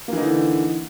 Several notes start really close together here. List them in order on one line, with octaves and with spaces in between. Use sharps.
A#3 E3 D#4 D3